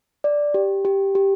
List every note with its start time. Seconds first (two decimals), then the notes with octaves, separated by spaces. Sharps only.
0.24 D5
0.54 G4
0.85 G4
1.15 G4